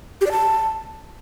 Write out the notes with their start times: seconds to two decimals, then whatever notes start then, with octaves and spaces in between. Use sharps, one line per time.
0.21 G4
0.26 D5
0.32 A5